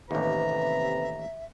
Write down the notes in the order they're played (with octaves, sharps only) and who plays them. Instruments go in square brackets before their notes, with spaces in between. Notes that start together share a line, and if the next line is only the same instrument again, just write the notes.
[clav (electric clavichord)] A1 D#2 [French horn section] C3 B4 [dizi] E5 [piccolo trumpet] A#5